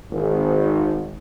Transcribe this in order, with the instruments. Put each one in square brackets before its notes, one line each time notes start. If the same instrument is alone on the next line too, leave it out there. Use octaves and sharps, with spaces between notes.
[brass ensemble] G#1